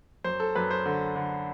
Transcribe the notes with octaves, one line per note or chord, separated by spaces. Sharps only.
F#2 C5
A4
F#2 B4
C5
D3
D3